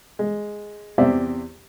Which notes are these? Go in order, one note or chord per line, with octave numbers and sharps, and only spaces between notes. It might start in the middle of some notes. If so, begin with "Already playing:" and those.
G#3
E2 C3 G4 C5 D5 E5